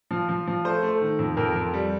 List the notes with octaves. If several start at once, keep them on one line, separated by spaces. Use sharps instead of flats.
F3
F3
F3
A3 C5
A3
D#3
F2
F2 A#4
F2
G3